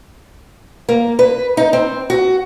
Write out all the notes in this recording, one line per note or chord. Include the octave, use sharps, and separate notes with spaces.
A#3
B4
D#4
C4
F#4